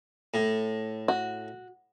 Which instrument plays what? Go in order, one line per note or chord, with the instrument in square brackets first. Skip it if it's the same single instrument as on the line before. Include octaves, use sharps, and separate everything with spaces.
[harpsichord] A2
[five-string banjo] F#4